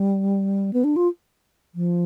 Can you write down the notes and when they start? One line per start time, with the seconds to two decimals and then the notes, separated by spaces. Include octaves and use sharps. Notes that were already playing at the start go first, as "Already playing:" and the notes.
Already playing: G3
0.73 B3
0.84 D4
0.96 F4
1.75 F3